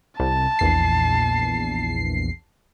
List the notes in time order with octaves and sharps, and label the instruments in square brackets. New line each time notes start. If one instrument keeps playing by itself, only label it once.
[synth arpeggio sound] C2 [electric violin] A5
[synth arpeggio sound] A#1 E2 C7